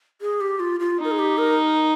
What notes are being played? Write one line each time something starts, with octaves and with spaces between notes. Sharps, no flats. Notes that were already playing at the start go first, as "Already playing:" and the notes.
G#4
G4
F4
F4
D#4
A#4
G#4
G4
A#4